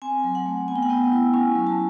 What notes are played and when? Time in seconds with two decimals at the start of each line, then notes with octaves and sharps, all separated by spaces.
0.02 C4 G#5
0.24 F#3
0.35 F#5
0.46 A3
0.68 B3 G#5
0.76 G5
0.83 F#5
0.90 B3 G5
1.12 E4
1.34 C#4 G#5
1.55 F#3
1.67 A5